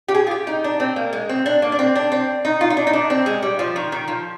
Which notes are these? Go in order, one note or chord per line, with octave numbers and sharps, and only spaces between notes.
G4
G#4
F4
G4
D#4
D4
C4
A#3
G#3
C4
D4
A#3
D4
C4
D4
C4
D#4
F4
D#4
D4
D#4
D4
C4
G#3
G3
F3
D#3
D#3
F3